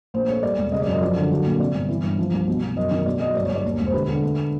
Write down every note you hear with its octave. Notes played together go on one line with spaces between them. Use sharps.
A#1 C5
A3 C#5
G3 D5
E1
C#3 D#5
D5
F#2
D#5
F3 D5
D3
F#3
A#2
C3 D5
G1
E3
G2
F3
C2
B2
B2
F#2 D#5
D#3
B1 D5
F#3 D#5
G1 D5
C#5
G1 D5
D#2
E1
C5
D3 B4
D3
A3